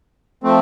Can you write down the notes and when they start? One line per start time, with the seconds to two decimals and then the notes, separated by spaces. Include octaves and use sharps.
0.44 F3 A3 C4